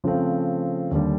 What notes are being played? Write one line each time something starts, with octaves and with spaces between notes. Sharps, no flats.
C#3 F3 A3 C4
D#2 D3 G3